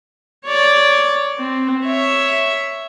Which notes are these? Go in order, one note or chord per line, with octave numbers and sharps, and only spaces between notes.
C#5 D5
C4
C#5 E5